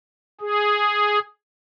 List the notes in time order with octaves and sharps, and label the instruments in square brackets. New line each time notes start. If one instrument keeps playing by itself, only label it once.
[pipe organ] G#4